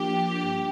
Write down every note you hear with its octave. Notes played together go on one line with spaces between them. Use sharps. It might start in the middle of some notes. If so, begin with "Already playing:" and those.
Already playing: F3 A#3 D4 G4
G2